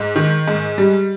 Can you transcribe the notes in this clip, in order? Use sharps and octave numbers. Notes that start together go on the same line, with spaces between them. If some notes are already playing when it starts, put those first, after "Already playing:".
Already playing: G#2
D#3
G#2
G3